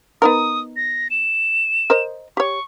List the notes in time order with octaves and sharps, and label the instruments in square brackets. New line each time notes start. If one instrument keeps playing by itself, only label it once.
[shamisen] B3 D#4 A#4 [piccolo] D#6
[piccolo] A#6
E7
[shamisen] A#4 C5 D#5
[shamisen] G4 C#5 [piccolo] C#6